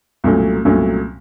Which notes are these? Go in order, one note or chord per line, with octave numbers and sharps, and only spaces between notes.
C2 A#2 F#3 A3 C#4
C2 A#2 F#3 A3 C#4